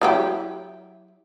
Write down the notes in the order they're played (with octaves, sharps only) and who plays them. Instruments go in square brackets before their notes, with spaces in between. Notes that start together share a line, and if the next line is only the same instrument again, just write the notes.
[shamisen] F#3 E4 G4